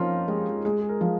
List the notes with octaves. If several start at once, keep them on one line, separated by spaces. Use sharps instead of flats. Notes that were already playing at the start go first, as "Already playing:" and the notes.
Already playing: F3 A#3 C4 C#4 D#4 F4
G#3 G4
G#3 G#4
G#4
A#4
F3